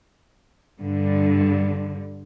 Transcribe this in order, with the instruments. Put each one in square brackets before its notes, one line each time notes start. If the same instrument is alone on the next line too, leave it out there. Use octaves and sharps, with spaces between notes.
[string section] G2 D3